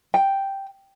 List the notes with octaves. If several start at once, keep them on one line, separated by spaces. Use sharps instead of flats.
G5